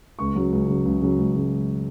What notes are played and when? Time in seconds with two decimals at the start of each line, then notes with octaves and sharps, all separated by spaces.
0.19 C#2 C#6
0.35 C#3 F#3
0.52 C#2
0.68 C#3 F#3
0.85 C#2
1.02 C#3 F#3
1.18 C#2
1.34 C#3 F#3